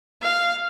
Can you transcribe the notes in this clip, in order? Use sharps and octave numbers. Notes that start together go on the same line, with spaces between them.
F5